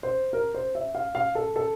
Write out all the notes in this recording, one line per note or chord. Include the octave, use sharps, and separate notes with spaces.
C5
A#4
C5
E5
F5
F5
A4
A4